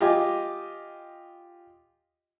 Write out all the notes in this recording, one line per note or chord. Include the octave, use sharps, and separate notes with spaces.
F4 G4 D#5 G#5